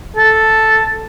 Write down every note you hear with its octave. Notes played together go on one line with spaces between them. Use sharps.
A4